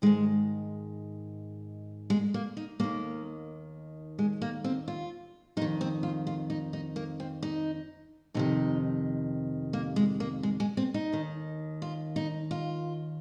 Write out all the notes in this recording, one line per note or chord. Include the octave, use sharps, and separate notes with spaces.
G#2 D#3 G#3
G#3
A#3
D#4
D#2 D#3 A#3
G#3
A#3
C4
F4
F2 D#3 D#4
C4
F4
F4
D#4
D#4
A#3
C4
D#4
F2 C3 D#3 D#4
A#3
G#3
A#3
G#3
G#3
C4
D#4
D#2 D#3
F4
D#4
F4